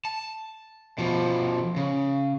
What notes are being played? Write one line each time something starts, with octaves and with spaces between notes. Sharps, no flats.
A5
B2 F3
C#3